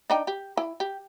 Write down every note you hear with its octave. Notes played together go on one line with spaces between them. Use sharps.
D4 D#4 G5
G4
E4
G4